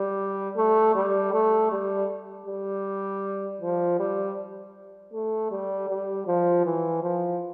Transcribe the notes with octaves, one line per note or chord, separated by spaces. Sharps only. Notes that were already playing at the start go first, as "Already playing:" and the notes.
Already playing: G3
A3
G3
A3
G3
G3
F3
G3
A3
G3
G3
F3
E3
F3